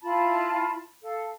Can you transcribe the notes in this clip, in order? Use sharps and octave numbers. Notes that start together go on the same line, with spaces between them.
E4 F4 A5 B5
A4 F5